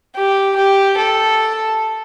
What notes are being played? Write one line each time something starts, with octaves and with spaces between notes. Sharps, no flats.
G4
G4
A4